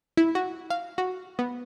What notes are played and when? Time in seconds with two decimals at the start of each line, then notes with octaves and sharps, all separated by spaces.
0.17 E4
0.35 F#4
0.70 F5
0.98 F#4
1.39 B3